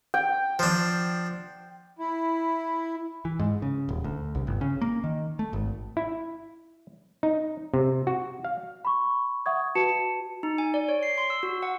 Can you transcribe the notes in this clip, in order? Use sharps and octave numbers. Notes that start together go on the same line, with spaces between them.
G5
F3 D4
E4
E3
G#2
C#3
D#1
D2
C2
G1
C#3
A#3
D#3
A3
G#1
E4
D#4
C3
F#4
F5
B5 C#6
E5 F#5 C#6 D#6 G#6
F#4 B4 A5 C#7 E7
D#4
G#5
D5
C#5
C7
C6
E6
F#4
F#5